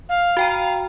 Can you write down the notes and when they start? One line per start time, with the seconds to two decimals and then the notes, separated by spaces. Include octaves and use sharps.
0.09 F5
0.37 F#4 G5 A#5